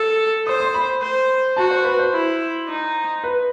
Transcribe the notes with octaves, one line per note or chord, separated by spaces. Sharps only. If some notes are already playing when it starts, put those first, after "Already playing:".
Already playing: A4 E6
C5 D#6
C6
B5
C5
F#4 A5
C5
B4
C5
E4
D#4
B4